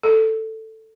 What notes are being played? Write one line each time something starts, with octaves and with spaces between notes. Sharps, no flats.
A4